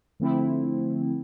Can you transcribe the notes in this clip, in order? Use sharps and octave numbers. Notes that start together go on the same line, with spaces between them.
D3 F3 A3 C4 E4